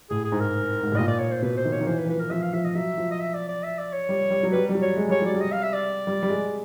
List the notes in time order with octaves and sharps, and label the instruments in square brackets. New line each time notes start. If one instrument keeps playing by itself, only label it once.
[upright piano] A2 [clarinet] G#4
[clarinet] G#4
[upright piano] G#2
[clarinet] A#4
[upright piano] G#2
A2
[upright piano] A#2 [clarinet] D#5
[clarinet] D5
C#5
C5
[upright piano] B2 [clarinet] B4
[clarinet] C5
[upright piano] D#3
[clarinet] C#5
[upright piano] D#3
[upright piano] E3 [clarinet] C5
[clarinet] B4
[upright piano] E3
[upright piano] F3 [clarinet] B4
[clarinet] A#4
[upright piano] F3 [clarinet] E5
[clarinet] F5
[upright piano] F3 [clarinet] E5
[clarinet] D#5
[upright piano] F#3 [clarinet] E5
[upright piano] F3
[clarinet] D#5
E5
D5
D5
E5
D5
C#5
[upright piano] G3
G3
F#3
[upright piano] G3 [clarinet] B4
[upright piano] G3
F#3
[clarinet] C#5
[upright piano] G#3
[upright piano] G3 [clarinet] C#5
[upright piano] F#3 [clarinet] D5
[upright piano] G3
[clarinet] D#5
F5
E5
D5
[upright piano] G3
G3
G#3